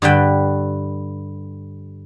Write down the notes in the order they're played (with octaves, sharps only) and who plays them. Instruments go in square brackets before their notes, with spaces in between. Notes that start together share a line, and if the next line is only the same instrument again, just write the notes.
[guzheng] G2 D3 B4 G5